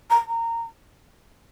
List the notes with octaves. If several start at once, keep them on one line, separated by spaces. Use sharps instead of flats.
A#5
A#5